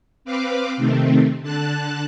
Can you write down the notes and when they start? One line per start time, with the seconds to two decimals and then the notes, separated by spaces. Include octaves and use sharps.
0.25 C4 B4 F5 D6
0.77 C3 D#3 A3 C4
1.41 D3 A5 F#6